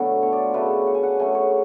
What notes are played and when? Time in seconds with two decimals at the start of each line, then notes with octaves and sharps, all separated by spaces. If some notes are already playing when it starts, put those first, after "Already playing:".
Already playing: B2 D3 F#3 A3 B3 A4
0.23 C#5
0.33 D5
0.43 F4
0.54 C#3 F#3 A3 B4
0.87 F#5
0.94 G#5
1.03 F#5
1.19 C#3 F#3 A3 G#5
1.35 C#5